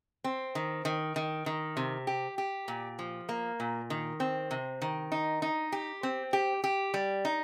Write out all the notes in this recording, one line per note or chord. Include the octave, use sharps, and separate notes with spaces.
C4
D#3
D#3
D#3
D#3
C3
G4
G4
A#2
F3
A#3
A#2
D#3
C4
C3
D#3
D#4
D#4
G4
C4
G4
G4
G3
D#4